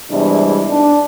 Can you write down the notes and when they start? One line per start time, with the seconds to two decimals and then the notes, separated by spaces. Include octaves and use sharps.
0.11 E2 C3 G3 G#3 D4 E4
0.71 D4